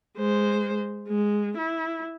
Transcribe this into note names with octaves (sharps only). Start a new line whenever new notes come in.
G#3 C5
G#3
E4